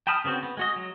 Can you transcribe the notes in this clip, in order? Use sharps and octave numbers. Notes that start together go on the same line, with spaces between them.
G5 A5 B5 D#6 F6
C#3 B3 C4 F#4
B3
G#3 F#4 D#5
F#3